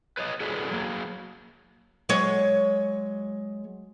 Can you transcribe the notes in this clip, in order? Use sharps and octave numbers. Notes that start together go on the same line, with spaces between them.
B4 C#5 D#5
E4 F#4 G#4 A4 B4 D5
F#3 A#3
F#3 G#3 C#5